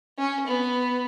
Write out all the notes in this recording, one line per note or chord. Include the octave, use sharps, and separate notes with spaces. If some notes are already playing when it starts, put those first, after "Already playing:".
C#4
B3